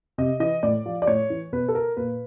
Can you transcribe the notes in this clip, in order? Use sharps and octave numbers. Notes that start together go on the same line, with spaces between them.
C3 D#5
E3 D#5
A2 D5
F3
D5
A2 C#5
E3
B2 B4
A4
A#4
A#2 B4